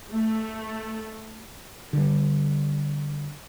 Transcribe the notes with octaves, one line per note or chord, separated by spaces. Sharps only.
A3
D3 G3